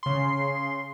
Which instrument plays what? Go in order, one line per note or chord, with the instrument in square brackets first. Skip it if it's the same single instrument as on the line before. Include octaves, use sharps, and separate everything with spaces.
[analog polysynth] C#3 C6